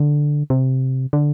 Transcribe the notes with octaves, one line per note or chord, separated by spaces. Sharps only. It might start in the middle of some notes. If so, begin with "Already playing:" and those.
Already playing: D3
C3
D3